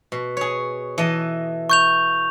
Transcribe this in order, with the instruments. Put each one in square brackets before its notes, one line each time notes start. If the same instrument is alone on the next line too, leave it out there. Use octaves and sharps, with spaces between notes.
[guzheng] B2
G#4 C#5
E3 A4 D#5
[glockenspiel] C#6 G6 F7